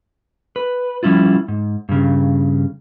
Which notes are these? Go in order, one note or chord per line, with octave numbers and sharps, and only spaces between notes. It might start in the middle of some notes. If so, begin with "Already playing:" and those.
B4
F3 G3 C#4 E4 F4
G#2
G2 C#3